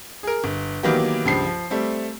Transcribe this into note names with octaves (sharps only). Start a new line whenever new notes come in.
G#4 A#4
G1
D#3 E3 F#3 A#3 B3 G4
C#2 G2 F3 C7
F3
G3 A3 C4